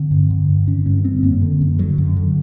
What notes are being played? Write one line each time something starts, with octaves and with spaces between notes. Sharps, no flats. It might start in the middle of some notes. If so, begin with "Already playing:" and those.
Already playing: D3 C4
G2
D3
G2
D3 C#4
G2 C#4
D3 C4
F#2 A#3
D3
F#2
D3 F#3
F#2
D3